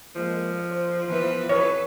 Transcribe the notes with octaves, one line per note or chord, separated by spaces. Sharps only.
F3 G#3 A#3
C5
E3 B3 B4
F2 E3 A4 B4 C#5